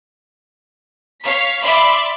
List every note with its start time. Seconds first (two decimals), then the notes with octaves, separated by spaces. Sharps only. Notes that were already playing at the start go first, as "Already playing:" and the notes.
1.24 C#5 F5 B6
1.64 D5 E5 B5 C6 D6